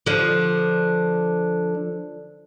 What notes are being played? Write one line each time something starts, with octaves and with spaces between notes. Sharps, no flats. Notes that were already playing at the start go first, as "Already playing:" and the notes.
D3 F3